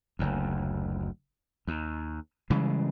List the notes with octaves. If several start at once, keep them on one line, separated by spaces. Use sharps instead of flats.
F#1 D2
D#2
C#3 E3 G3 G#3